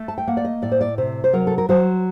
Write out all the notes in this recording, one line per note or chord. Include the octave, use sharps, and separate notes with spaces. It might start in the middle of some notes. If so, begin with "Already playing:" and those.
Already playing: A3
A5
G5
A#3 F#5
D5
D#5
A2 D5
C5
D5
C3 C5
C5
F#3 A#4
A4
A#4
F#3 C5